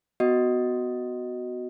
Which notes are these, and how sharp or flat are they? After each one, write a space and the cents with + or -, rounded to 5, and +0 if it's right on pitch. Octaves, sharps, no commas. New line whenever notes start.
B3 +10 F#4 +0 D#5 +0